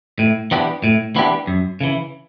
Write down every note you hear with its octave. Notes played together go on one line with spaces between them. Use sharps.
A2
E3 B3 D4 G4
A2
E3 B3 D4 G4
F#2
C#3 E3